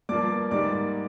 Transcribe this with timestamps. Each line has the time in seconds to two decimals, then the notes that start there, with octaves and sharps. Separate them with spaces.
0.09 G2 F3 A#3 D5 D6
0.51 G#2 G3 A#3 D5 D6